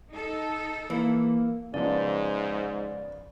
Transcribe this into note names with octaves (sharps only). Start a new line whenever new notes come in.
D#4 A4
E3 A#3
G#2 C#3 F3 B3 D5